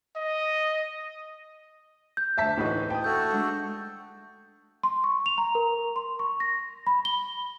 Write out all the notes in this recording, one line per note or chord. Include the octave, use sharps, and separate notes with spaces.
D#5
G6
D2 C5 E5 A5 B6
A2 E3 D#4 F#4
E4 G5 A5 D#6
A3 F#4 A4 G6
G#3 D4 F#5
C6
C#6
F7
A#5
A#4
C6
C#6
A#6
B5
G7